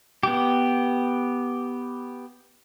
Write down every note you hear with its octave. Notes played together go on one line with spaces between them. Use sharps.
B3 G4